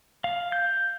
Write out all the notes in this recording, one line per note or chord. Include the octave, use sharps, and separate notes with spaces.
F5
G6